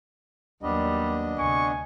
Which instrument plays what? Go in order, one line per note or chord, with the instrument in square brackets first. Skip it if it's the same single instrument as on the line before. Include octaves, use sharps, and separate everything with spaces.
[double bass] D#2 F#3 [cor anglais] G3 [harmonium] B3 D4 D#5
[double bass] D2 C3 [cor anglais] G#5 [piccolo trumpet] C#6